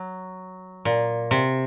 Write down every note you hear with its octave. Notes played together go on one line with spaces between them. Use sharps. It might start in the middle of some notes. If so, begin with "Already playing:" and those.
Already playing: F#3
A#2
C3